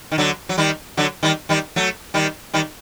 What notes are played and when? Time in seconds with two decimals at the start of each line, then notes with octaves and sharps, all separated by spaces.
0.12 D#3
0.18 D3 F#3
0.49 F#3
0.58 D#3 G3
0.97 D3 F#3
1.23 D#3 G3
1.49 D#3 G3
1.76 F#3 A3
2.14 D#3 G3
2.54 D#3 G3